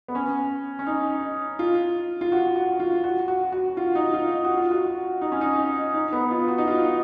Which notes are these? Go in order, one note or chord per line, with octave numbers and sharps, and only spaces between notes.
B3
C#4
C#4
D#4
F4
F4
F#4
F#4
F4
F#4
F#4
F#4
F4
D#4
F4
F#4
F4
F#4
D#4
C#4
D#4
D#4
B3
F4
F#4
D#4
F4